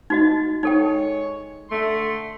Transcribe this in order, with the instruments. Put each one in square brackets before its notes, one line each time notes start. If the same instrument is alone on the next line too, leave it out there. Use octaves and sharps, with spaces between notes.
[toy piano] D#4 F#4 D#5
[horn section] G#3 C#5 [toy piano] D#4 A4 G5
[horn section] D3 A3 C6